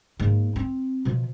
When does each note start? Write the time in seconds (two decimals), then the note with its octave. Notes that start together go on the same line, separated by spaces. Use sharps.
0.19 G#2 A#3
0.56 C4
1.05 B2 F3